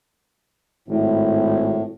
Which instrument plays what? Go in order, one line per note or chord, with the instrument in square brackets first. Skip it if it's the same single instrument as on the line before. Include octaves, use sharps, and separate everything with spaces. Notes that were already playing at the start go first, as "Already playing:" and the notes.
[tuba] G#1 [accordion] A2